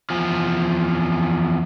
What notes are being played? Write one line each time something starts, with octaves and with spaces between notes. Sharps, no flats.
E2 F3